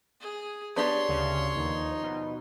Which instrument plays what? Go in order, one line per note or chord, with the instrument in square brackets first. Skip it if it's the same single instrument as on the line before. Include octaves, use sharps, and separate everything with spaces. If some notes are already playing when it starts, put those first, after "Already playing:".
[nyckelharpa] G#4
[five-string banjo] B3 D4 G4 [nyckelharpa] C#5 C6
[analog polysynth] D2 C#3
[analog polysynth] D#2 [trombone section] F3 D#4
[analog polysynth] B2